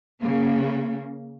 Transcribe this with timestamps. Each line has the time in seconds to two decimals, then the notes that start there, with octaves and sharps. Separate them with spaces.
0.21 C#3 A#3